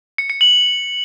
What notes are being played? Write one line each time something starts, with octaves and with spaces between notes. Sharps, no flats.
C#7
C#7
F#7